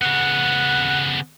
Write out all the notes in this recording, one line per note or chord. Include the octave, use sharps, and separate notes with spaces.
C#3 B3 F#5